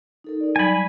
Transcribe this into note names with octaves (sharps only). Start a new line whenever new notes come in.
D#4 A4 A#4
D#4 D5
F#3 G3 D5 G#5 B5